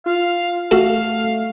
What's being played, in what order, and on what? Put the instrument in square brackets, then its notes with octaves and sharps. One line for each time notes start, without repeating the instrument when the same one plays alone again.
[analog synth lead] F4 [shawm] F5
[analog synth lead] A3 [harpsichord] F#4 A4 [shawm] F5